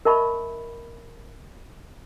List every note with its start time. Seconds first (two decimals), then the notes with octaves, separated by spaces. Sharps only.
0.05 A#4 D#5 E5 A5 B5 C#6